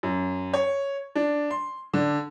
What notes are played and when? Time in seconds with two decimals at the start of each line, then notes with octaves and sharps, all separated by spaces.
0.03 F#2
0.53 C#5
1.15 D4
1.51 C6
1.94 D3